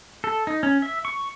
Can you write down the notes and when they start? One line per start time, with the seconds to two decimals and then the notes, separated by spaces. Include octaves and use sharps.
0.24 A4
0.47 D#4
0.63 C#4
0.82 E5
1.05 C#6